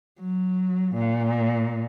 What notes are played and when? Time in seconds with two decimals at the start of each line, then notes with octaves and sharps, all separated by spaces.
0.21 F#3
0.95 A#2